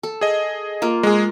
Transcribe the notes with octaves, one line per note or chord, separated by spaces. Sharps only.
A4
G#4 D#5
A#3 F4
G#3 G#4